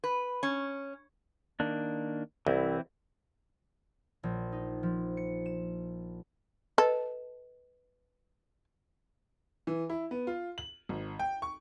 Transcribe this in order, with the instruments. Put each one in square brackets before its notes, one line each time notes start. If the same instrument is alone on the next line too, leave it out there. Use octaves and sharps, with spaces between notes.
[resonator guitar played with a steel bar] B4
C#4
[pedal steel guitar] D#3 A#3 D4
[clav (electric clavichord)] C2 [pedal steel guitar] E3 C4 E4
[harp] A#1
D#4
F3
C#7
E7
[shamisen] A4 [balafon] B4 D#5
[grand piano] E3
E4
B3
F4
F#7
G#1
G5
C#6